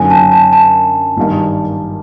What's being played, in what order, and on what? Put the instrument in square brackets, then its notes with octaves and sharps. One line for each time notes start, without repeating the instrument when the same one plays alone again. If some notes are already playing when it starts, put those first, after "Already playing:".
Already playing: [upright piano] F#2 D3 F#3 A#3 D#4 [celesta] G#5
[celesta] A5
A5
A5
[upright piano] G#1 G2 D#3 G3 A#3